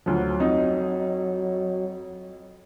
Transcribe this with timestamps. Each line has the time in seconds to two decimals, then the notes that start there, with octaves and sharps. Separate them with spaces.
0.06 D2 F3 F#3
0.39 F2 D#4 D#5